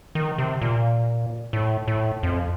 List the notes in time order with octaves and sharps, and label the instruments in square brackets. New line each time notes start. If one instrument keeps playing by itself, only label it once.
[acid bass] D#3
C3
A#2
A2
A2
F2